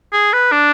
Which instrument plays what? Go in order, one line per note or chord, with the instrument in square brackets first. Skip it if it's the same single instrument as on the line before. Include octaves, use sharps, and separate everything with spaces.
[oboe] G#4
B4
D4